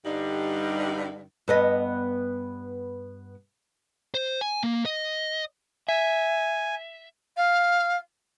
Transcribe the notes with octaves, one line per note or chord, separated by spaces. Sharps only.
G2 D3 G3 D#4
G2 B3 D#5
C5
G#5
A#3
D#5
E5 G#5
F5